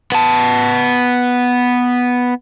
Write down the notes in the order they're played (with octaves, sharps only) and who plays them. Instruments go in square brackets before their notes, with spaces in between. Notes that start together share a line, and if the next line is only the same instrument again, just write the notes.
[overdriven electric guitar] B3 A5